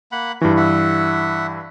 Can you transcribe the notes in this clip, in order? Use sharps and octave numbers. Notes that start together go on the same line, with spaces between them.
A#3 F#5 B5
G2 E3 F#4
E5 F#5